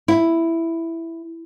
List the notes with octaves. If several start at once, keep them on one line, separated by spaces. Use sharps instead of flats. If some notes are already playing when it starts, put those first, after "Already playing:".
E4